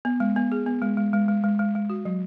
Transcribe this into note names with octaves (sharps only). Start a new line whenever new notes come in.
B3
G#3
B3
G#4
B3
G#3
G#3
G#3
G#3
G#3
G#3
G#3
F#4
F#3